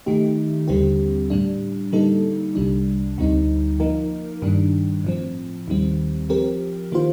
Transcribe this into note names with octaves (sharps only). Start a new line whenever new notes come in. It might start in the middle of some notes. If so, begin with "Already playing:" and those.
D#3 A3 D#4 G4
D#2 D3 G3 C4 G4
A2 G3 D4
D3 G3 A#3 D#4 A4
C2 C3 G3 D4
D2 D3 G3 C4 D#4
F3 A#3 D#4 A#4
G2 D#3 G3 D4
A2 F3 C4
D#2 D#3 G3 C4
F3 C4 G4 A#4
D#3 A#3 F4 C5